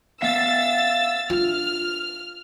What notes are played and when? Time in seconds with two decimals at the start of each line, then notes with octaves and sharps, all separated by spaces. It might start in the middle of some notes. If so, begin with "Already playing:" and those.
0.22 B3 E5 F5 E6 A6
1.30 D4 F4 F6